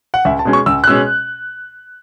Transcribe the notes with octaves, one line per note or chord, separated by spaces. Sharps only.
F#5
C#2 E5
A5
B2 G#3 C#4
C#6
C#2 E6
F#6
B2 G#3 C#4 E6